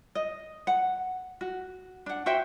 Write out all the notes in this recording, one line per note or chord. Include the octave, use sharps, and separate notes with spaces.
D#5
F#5
F#4
D4 F#5
F#4 C5 E5 G5